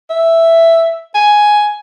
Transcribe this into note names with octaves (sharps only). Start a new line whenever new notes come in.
E5
G#5